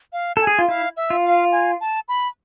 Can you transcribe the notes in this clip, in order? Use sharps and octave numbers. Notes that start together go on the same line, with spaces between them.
F5
A4 G#5
G#4
F4
E4 F5
E5
F4
F5
G#5
A5
B5